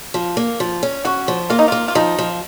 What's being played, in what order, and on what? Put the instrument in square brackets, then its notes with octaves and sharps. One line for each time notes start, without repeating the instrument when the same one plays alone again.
[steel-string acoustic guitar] F3
A#3
F3
C#4
[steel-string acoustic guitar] C#4 [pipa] F#4
[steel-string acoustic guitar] F3
[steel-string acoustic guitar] A#3 [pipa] F4
[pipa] D#4
[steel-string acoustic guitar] A#3 [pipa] F4
[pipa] F4
[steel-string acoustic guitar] F3 [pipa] D#4
[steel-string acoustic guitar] F3